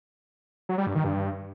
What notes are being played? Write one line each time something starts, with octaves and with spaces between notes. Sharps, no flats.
F#3
G3
G2
D#3
G2